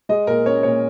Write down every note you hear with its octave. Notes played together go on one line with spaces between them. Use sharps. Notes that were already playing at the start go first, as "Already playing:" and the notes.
G#3 D#5
A#2 A#4
C#4 C#5
A#2 C#5